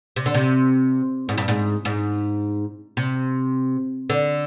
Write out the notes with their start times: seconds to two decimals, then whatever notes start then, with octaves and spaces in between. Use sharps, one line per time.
0.16 C3
0.26 D3
0.34 C3
1.29 G#2
1.38 G2
1.48 G#2
1.85 G#2
2.97 C3
4.10 D3